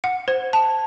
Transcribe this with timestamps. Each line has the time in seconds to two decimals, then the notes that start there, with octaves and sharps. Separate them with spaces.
0.04 F#5
0.28 C5
0.53 A5